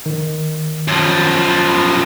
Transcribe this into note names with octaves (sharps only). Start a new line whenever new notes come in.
D#3
F#2 F3